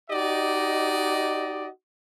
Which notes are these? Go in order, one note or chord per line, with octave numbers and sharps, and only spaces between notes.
D#4 F#4 G4 D5 D#5